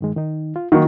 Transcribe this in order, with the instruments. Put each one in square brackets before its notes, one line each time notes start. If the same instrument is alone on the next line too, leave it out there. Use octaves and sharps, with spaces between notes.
[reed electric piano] G2 D#3 G#3
D#3 D#4
F4
[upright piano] D#3 F#4 [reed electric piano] F#3 A#3